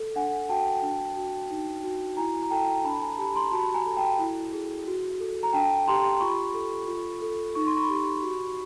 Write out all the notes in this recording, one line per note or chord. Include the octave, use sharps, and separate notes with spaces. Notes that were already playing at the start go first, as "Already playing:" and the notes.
Already playing: A4
D4 F#5 G#5
F#4 G5 A5
D4
F#4
D#4
F#4
E4 G#5 A#5
A#5
A4 G5 A5
D4 A5 B5
G#5 A#5
G4 A5 B5
A#5 C6
F#4 A5 B5
G#5 A#5
A4
G5 A5
E4
G#4
F#4
A4
A#5
D4 G5 A5
G4 A#5 C6
F4 B5 C#6
A4
F4
A4
D#4 C#6
C6
B5 C#6
G4
F#4